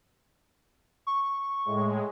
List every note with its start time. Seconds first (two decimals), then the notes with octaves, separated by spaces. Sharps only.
1.07 C#6
1.65 A2 G#3